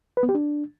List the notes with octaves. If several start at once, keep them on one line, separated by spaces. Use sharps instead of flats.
B4
B3
G4
D4